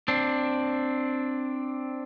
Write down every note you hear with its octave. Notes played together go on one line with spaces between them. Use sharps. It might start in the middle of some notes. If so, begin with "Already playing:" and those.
C4 D4